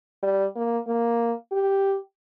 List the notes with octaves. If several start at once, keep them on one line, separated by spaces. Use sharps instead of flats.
G3
A#3
A#3
G4